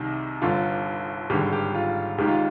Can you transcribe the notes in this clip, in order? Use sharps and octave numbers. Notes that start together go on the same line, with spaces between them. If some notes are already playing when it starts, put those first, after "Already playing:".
Already playing: C2 C3 D#3
G1 G2 D3 F4
G#1 G2 D3 G4
G4
F4
G#1 G#2 D#3 G4
F4